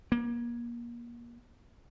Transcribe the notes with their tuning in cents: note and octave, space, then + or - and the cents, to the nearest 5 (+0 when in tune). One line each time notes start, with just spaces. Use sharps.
A#3 +30